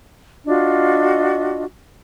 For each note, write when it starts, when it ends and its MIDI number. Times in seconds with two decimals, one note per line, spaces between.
0.46 1.63 62
0.46 1.63 65
0.46 1.63 66
0.46 1.63 75